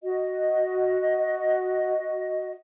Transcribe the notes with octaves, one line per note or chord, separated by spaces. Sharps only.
F#4 D#5